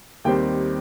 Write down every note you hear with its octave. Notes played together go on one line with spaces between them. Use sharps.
D#2 D#3 G3 C4 G5